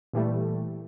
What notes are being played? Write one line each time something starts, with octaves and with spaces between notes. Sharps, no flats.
A#2 E3 G3 A3